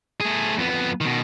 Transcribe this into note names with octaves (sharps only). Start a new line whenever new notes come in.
A3 G#4
F2 B3
B2 D#3